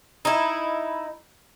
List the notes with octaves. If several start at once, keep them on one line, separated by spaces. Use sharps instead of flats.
D#4 E4